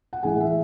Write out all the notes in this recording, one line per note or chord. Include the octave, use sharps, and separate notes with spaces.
F#5
A2 E3 G#3 G#4 G#5
E5